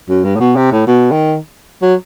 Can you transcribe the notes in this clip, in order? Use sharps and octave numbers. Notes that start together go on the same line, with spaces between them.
F#2
G2
A2
B2
C3
A2
B2
D#3
F#3